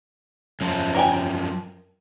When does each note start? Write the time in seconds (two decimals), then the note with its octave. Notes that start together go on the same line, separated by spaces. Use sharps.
0.61 F#2 F3
0.94 A#4 G5 G#5